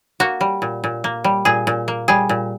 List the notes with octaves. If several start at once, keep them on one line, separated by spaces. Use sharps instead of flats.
A#3 F#4
G3
A#2
A#2
A#3
G3
A#2 G#4
A#2
A#3
G3 G#4
A#2